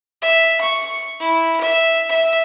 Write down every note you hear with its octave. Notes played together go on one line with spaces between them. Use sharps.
E5
C#6
E4
E5
E5